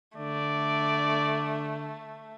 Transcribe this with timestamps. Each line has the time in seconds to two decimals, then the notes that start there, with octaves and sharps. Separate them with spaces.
0.17 D3 A3 D5